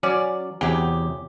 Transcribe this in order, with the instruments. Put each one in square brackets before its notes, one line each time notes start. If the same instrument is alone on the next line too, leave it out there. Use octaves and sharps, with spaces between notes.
[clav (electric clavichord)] F#3 [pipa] C#4 D5
[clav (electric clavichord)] E2 C3 G#5 [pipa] F#3 G4